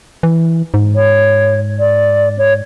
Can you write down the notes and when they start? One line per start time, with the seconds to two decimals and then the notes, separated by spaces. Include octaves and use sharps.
0.23 E3
0.74 G#2
0.95 C#5
1.79 D5
2.38 C#5